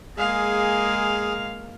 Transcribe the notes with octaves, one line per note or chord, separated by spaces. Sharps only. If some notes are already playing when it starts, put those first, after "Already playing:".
G#3 A#3 G#4 F5